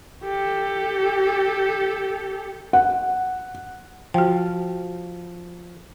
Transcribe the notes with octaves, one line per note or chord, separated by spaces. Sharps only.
G4 A4
F#5
F3 F#4 G5